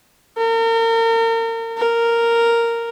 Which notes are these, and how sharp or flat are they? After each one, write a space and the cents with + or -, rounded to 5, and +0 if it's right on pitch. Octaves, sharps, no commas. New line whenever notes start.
A#4 -35
A#4 -5